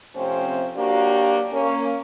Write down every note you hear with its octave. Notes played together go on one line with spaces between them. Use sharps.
C3 F3 A3 C4 C#4 C5
F#3 A#3 D4 F#4 G4
A#3 C#4